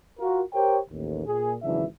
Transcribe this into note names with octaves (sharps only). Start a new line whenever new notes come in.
F4 F#4 A#4
G4 A#4 C5 C#5 G5
A1 D#2
A#2 G#4
G#1 C#3 E3 F#3 D4 E5